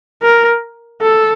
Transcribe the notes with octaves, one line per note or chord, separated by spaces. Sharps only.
A#4
A4